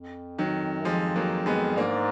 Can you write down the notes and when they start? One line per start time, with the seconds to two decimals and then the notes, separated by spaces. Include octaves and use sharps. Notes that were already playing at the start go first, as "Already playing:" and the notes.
Already playing: F2
0.38 D#3 F#3
0.81 F#2
0.85 F2 F3 G#3
1.16 F#3 A#3
1.46 G#3 B3
1.77 G#2 A#3 D4